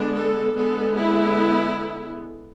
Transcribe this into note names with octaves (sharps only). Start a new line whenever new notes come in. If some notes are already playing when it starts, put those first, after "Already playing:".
Already playing: D3 G#3 B3 D4
A4
D3 G#3 B3 A4
E4